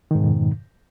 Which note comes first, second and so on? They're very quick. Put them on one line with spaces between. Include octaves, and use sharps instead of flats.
D#3 G#2 B2 F2